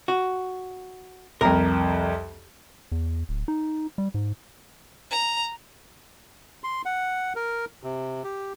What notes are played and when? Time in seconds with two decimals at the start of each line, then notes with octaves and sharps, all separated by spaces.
0.08 F#4
1.41 C2 F2 A#4
2.92 E2
3.29 D1
3.48 D#4
3.98 G3
4.14 G#2
5.11 A#5
6.64 C6
6.85 F#5
7.36 A#4
7.84 C3
8.24 G4